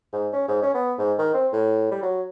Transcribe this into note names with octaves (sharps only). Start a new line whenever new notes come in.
G#2
C#4
G#2
C#4
B3
G#2
D#3
C4
A2
G3
F#3